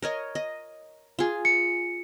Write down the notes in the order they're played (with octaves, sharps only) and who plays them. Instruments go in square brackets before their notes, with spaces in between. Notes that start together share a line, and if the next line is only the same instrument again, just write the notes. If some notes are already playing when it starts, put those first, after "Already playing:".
[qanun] A#4 C#5 D#5
D#5
F4 G#4
[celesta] C#7